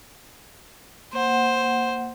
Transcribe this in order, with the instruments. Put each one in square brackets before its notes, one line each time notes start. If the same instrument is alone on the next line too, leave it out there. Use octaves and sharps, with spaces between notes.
[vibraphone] A#3 F#5 [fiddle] C5